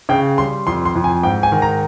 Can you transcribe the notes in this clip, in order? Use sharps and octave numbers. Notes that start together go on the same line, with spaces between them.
C#3 G5
G3 C6
F2 C6
C6
F2
G#5
G#2 G5
G#5
D#3
A#5